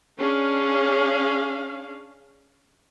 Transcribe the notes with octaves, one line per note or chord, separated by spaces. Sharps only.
C#4 D4 G#4 F5